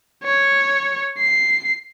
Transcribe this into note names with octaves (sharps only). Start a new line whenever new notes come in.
C#5
C7